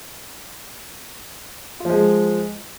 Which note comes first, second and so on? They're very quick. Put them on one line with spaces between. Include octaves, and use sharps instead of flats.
F4 F3 G#3